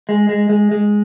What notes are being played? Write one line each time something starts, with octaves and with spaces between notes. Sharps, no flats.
G#3
G#3
G#3
G#3